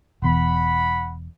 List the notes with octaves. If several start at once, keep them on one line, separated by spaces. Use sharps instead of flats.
E1 E2 F#5 B5